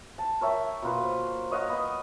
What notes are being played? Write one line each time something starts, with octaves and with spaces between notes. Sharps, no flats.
A5
A#4 C#5 E5 G5
B2 A#3 F4 B4
C5
C#5 D#5 F5 F#5
B3 D#5